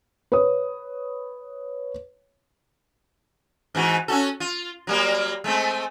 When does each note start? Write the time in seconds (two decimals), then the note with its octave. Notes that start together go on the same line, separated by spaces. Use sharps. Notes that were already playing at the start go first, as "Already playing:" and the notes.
0.32 B4 C#5 D#6
3.75 G#2 E3 F#4
4.08 C#4 F#4 A4
4.40 F4
4.87 F#3 G3 A#3
5.44 G#3 A3 C4